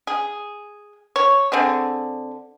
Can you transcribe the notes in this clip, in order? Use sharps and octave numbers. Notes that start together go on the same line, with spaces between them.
G#4
C#5
D3 C4 G#4